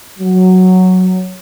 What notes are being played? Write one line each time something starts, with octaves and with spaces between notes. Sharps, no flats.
F#3